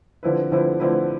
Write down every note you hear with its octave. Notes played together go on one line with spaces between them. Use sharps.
D3 F3 C4 E4 B4
D3 F3 C4 E4 B4
D3 F3 C4 E4 B4